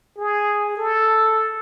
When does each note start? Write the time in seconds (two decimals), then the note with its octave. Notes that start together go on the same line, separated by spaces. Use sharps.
0.18 G#4
0.77 A4